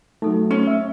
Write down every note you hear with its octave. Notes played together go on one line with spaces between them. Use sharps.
F#3 A3 D#4 A4
C#4
E5